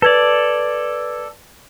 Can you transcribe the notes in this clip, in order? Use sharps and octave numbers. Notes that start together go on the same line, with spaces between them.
A4 B4 D5 G#6